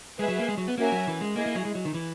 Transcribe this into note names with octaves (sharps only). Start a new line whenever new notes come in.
G#3 G#4 B4 E5
F#3
A#3
G#3
F#3
B3
A#3 C#4 F#4 A#4 E5 G#5
F#3
E3
G#3
A#3 E4 G#4 D#5
A#3
F#3
G#3
F#3
D#3
E3